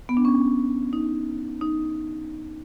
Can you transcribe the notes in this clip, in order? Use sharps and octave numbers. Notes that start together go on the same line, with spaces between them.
B3
D4
C#4
D#4
D#4